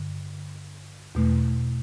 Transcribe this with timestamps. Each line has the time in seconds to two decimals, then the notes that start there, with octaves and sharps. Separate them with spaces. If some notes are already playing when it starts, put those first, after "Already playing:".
Already playing: G2 D3
1.15 E2 B2 A3